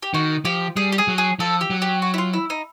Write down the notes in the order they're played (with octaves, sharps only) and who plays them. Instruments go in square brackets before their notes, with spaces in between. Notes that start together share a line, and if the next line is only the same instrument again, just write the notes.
[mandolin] G4
[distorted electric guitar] D#3 [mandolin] F#4
[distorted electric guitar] F3 [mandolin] G4
[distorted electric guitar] G3 [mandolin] G#4
[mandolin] G4
G#4
[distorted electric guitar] F#3
[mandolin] G#4
[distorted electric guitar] F3 [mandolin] A4
[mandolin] G4
[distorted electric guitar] F#3
[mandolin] G4
F#4
E4
F4
E4
D#4